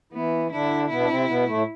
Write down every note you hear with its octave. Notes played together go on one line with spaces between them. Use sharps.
E3 B3 E4
D3 D4 E4
B2 B3 E4
D4
C3 C4
B2 B3
A2 A3